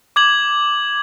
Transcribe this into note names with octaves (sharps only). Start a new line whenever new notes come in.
D6 G#6 F#7